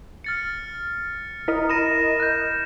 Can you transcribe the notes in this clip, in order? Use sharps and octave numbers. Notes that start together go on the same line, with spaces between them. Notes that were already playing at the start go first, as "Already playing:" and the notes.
F6 A6 C#7
E4 A#4 D#5 B6
B5 A#6 D#7 E7
F#6 G6